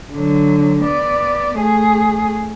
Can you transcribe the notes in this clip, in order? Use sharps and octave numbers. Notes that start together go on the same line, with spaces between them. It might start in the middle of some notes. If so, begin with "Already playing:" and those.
D3 F#3
B3 D5
A3 G#4